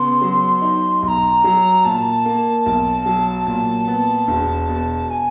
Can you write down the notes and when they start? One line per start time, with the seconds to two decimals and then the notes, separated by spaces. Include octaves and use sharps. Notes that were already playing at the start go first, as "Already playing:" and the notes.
Already playing: C#3 B3 C6
0.21 F#3
0.62 D#4
1.02 B1 C6
1.08 A#5
1.44 F#3
1.85 A#2 A5
2.26 A#3
2.66 B1
3.06 F#3
3.46 A#2
3.87 B3
4.28 E1
4.69 B2
5.10 G#5